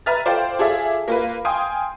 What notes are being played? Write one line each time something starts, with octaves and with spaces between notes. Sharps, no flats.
B4 E5 A#5 F6 A6
F4 A4 C5 D5 F5 G5
F4 G#4 A4 D5 E5
A#3 F4 B4
F5 G5 G#5 C6 D#6